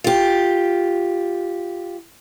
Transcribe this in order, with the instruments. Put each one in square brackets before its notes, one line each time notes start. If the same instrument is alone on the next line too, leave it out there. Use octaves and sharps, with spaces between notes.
[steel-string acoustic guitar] F4 G4